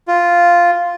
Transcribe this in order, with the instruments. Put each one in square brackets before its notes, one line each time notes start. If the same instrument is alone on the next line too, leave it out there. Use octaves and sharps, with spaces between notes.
[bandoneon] F4